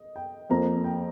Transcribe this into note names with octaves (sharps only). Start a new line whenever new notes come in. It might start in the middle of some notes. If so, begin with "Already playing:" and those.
Already playing: D#5
G5
F2 F3 A#3 A#5
G5